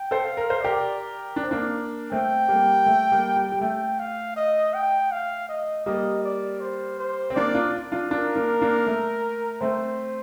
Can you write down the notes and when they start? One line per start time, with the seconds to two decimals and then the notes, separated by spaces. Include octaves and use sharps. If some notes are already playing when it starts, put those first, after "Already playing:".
Already playing: G5
0.11 A4 C5
0.25 F5
0.37 A#4
0.50 C5
0.61 G4 A#4 D5
1.36 D4
1.44 C4
1.51 A#3 D4
2.12 A3 C4 G5
2.48 G3 A#3
2.86 A3
3.12 G3 A#3
3.36 G3
3.52 G3
3.61 A3 G5
3.99 F5
4.36 D#5
4.74 G5
5.12 F5
5.49 D#5
5.86 G3 A#3 D#5
6.24 D5
6.61 C5
6.99 C5
7.30 C4
7.36 A#3 D4 D5
7.54 D4 F4
7.92 D4 F4
8.11 D4 F4 A#4
8.36 A#3 D4
8.61 A#3 D4
8.86 A3
9.61 A3 C4 C5